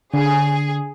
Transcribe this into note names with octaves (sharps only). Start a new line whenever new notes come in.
D3 G#4